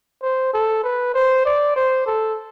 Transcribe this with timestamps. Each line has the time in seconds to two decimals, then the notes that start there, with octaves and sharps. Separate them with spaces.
0.23 C5
0.54 A4
0.84 B4
1.15 C5
1.45 D5
1.76 C5
2.07 A4